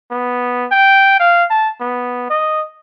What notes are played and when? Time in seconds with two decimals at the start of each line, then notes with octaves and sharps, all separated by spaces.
0.11 B3
0.72 G5
1.20 F5
1.50 A5
1.81 B3
2.30 D#5